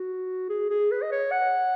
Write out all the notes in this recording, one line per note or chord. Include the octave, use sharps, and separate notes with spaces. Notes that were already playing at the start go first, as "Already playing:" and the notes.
Already playing: F#4
G#4
G#4
B4
D#5
C#5
F#5